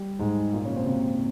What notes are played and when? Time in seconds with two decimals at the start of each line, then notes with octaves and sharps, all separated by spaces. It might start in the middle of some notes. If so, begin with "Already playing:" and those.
Already playing: G3
0.19 G#2 G#3
0.53 A#2 A#3
0.65 C#3 C#4
0.76 C3 C4
0.87 C3 C4